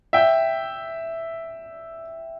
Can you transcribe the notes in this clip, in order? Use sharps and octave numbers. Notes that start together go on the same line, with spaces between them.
E5 G5